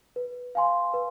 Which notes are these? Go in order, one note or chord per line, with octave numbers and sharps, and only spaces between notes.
B4
F5 G#5 C6
B4